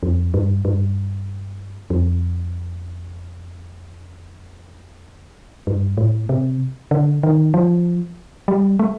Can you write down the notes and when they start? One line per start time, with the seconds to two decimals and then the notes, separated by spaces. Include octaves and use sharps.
0.03 F2
0.34 G2
0.65 G2
1.90 F2
5.67 G2
5.97 A2
6.29 C3
6.91 D3
7.23 D#3
7.54 F3
8.48 G3
8.79 A3